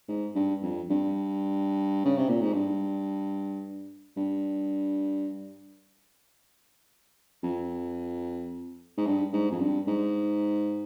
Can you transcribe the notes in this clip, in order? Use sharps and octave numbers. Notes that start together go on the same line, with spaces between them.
G#2
G2
F2
G2
C#3
C3
A#2
G#2
G2
G2
F2
G#2
G2
G#2
F2
G2
G#2